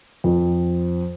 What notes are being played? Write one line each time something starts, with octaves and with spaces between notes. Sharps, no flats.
F2